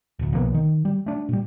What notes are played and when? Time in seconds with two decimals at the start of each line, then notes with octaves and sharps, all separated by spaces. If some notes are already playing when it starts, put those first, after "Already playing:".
0.19 D1 D2
0.33 B1 F3 A#3 B3
0.54 D#3
0.85 G3
1.06 A3 D4
1.29 A#2 G3